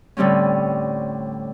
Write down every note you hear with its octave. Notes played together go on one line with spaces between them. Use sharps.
A2 D3 G3 C4 C#4